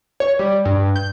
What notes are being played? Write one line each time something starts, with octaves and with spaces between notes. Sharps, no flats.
C#5
G3
G2
G6